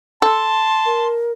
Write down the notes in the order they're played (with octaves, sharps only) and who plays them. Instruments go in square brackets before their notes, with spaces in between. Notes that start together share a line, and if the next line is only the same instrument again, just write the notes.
[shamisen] A4 [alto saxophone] A5 [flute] C6
[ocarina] A#4